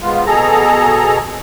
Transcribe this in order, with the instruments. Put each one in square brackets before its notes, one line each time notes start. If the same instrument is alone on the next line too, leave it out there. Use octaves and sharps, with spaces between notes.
[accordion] G#2 B3 F4
B2 G#4 A4 A#5